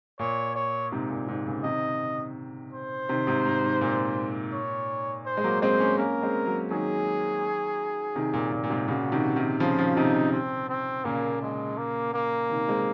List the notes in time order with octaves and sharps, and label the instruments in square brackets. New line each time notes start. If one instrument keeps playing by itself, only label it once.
[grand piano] A#2 [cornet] C#5
[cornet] C#5
[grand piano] G#2 C3
A#2
G#2 C3
A#2 C#3
[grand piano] C3 D#3 [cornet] D#5
[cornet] C5
[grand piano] C3 D#3
G#2 C3
G#2
G#2
A#2
[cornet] C#5
C5
[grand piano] G#3
F#3 A#3
[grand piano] G#3 C4 [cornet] C5
[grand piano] A#3 C#4
[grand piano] A#3 C#4 [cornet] A#4
[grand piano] G#3 C4
F#3 A#3
[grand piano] D#3 F#3 [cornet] G#4
[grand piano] C3 D#3
A#2
A#2
A#2
G#2 C3
[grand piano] A#2 C#3 [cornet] F#4
[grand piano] C3 D#3
C3 D#3
[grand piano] C#3 F3 [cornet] F4
[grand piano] C#3 F3
[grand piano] C3 D#3 [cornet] D#4
[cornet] C4
C4
[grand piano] A#2 C#3 [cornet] A#3
[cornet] G#3
A#3
A#3
[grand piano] C3 D#3
G#3 C4